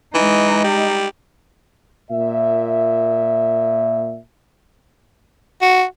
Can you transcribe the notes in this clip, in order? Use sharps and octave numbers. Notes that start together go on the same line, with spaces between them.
E3 G#3 D#4
G3
A#2 E5
F#4